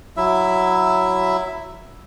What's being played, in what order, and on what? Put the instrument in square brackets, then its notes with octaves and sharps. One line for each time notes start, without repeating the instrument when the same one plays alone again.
[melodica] F#3 E4 E5